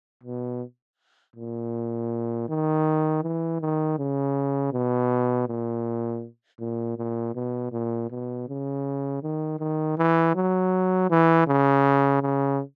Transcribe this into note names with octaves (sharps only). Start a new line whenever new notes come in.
B2
A#2
D#3
E3
D#3
C#3
B2
A#2
A#2
A#2
B2
A#2
B2
C#3
D#3
D#3
E3
F#3
E3
C#3
C#3